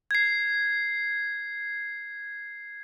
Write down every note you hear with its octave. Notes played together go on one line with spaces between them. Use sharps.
G#6 C7